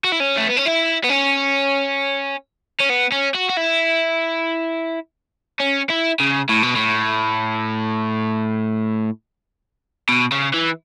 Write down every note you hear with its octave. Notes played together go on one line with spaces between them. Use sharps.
F#4
E4
C#4
A3
B3
C#4
E4
B3
C#4
C#4
B3
C#4
F#4
F#4
E4
C#4
E4
C#3
A2
B2
A2
B2
C#3
E3